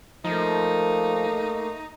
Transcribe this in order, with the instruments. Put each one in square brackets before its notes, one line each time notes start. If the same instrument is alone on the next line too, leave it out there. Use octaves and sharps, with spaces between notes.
[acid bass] F3 [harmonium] A3 A#3 [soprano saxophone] D#4